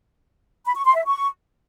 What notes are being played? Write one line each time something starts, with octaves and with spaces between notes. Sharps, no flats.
B5
C#6
C6
E5
C#6